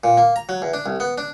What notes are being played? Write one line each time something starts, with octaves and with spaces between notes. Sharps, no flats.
A#2
A#3
A#5
F#3
E2
D4
C2
B3
D4